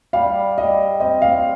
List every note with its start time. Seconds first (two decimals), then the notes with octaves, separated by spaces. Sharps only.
0.13 G3 F5
0.58 G3 D#5
1.00 C4 D#5
1.22 F5